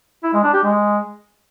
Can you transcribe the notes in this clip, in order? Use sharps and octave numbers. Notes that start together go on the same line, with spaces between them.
E4
G#3
D4
G4
G#3